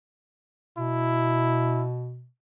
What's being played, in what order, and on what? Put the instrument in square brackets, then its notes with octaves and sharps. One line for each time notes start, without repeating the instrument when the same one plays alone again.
[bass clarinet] B2 [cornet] E4